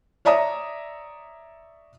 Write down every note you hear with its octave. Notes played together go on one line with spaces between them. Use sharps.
C#5 D5 E5 A#5 D#6